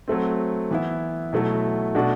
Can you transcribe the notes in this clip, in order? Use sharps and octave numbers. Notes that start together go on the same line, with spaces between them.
F#3 A3 C4
E3 B3 E4
B2 F#3 A3 E4
B2 A3 D4 F#4